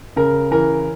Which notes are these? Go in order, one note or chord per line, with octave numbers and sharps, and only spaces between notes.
C#3 A#4
E3 A#4